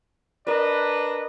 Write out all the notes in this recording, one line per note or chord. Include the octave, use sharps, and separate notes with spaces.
D4 A#4 B4 D5 D#5